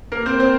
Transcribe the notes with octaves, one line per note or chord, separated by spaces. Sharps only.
A#3 A#4
C4 C5
C4 C5